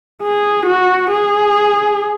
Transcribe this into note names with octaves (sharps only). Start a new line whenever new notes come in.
G#4
F#4
G#4